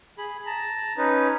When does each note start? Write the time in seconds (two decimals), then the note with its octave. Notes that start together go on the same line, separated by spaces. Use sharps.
0.18 G#4 B5
0.46 A5 A#5
0.97 C#4 D#4 B4